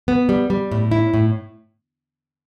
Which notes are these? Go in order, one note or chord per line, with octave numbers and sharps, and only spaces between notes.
B3
G3
G3
A2
E4
A2